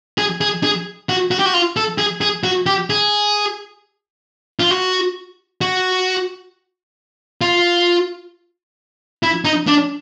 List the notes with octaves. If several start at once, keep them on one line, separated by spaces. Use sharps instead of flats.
G#4
G#4
G#4
F#4
F#4
G4
F#4
F4
A4
G#4
G#4
F#4
G4
G#4
F4
F#4
F#4
F4
E4
D#4
D4